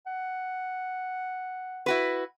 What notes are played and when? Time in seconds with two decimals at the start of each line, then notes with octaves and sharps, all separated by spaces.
0.06 F#5
1.86 E4 F#4 B4